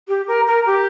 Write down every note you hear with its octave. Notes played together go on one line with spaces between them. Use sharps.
G4
A#4
A#4
G4